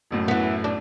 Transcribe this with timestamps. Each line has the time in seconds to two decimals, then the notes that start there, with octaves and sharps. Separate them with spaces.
0.11 A1 F#2 A2
0.28 E3 B3
0.64 D4